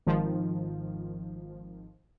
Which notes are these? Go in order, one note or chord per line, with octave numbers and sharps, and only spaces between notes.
G#1 D#3 F3